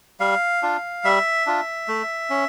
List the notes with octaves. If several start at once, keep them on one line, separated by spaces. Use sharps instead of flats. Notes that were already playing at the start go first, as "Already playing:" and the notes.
G3 F5
D4 F4
G3 E5
D4 F4
A3
C#4